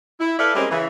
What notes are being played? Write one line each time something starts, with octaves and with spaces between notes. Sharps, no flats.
E4
E4 A4 B4 D5 E5 F5
G3 G#3 A#3 C4 C#4 G4
C#3 E3 E4